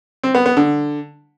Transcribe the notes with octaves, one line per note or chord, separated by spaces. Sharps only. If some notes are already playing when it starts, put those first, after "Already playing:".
C4
B3
B3
D3